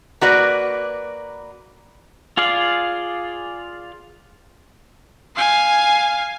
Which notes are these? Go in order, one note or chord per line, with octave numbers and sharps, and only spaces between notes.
A#3 F#4 B4 D5
F4 G#4 D5 F5
F5 G#5